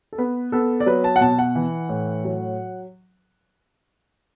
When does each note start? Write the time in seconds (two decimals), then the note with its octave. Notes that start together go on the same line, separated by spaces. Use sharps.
0.13 A4
0.18 B3 B4
0.52 B3 A4
0.80 D5
0.86 F#3 B4
1.04 A5
1.16 F#5
1.21 B2 A5
1.39 F#5
1.55 E3
1.89 A2
2.24 F#3